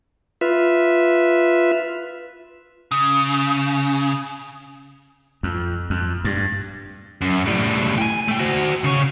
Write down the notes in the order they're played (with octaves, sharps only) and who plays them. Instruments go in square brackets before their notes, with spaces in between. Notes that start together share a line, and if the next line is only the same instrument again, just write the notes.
[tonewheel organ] F4 B4 E5
[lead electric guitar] C#3
[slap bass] F2
F2
G2
[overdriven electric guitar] F#2
A2 G3
G5 G#5
A3 G5
F#4 C5
C#3 C#5